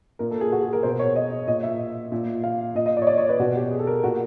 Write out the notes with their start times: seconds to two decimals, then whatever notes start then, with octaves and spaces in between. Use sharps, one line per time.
0.19 A#2 A#4
0.31 A4
0.41 G#4
0.52 F#4
0.63 G#4
0.73 A#4
0.83 B2 C5
0.99 C#5
1.16 D#5
1.47 A#2 D#5
1.63 E5
2.12 A#2
2.44 F5
2.75 A#2 D#5
2.86 D#5
2.97 D5
3.02 C#5
3.07 D5
3.17 C#5
3.29 B4
3.40 B2 F#4
3.55 G4
3.71 G#4
3.79 A4
3.87 A#4
4.03 A#2 F#4